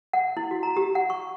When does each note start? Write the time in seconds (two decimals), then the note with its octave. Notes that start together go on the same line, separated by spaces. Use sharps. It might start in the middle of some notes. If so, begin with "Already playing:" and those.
0.13 F#5
0.37 E4
0.51 F#4
0.63 A#5
0.77 G4
0.95 F#5
1.10 C#6